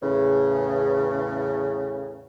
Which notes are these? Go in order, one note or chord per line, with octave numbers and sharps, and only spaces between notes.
E2 A2 C#3